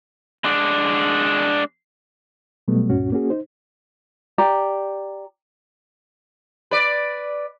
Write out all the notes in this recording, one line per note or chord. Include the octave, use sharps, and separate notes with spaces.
G#3 D4
B2 F#3 G3 A3 B3
C#2 G2 A#2 C#4 F#4
A#3 C#4 F#4 G#4
D#4 C5
G4 D5 A#5
B4 D5